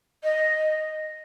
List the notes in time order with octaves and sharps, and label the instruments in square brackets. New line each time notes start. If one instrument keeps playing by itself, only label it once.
[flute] D#5